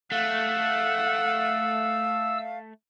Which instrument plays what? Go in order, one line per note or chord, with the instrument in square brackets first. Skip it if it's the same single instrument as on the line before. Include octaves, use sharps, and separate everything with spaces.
[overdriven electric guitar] A3 [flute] F5 [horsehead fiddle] F#5 [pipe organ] E6